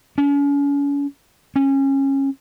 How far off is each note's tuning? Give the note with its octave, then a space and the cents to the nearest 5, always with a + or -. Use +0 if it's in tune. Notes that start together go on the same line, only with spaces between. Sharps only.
C#4 +40
C#4 -20